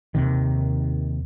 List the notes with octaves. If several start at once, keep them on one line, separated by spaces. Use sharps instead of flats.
D#2 C3 D#3